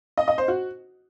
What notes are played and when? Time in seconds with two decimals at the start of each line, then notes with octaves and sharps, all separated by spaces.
0.18 D#5
0.28 D#5
0.38 C5
0.48 F#4